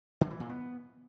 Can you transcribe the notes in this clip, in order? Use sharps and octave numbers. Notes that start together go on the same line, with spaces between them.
D3
E3
A#2
B3